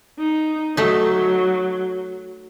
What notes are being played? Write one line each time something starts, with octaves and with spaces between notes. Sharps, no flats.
D#4
F#3 A3 D#4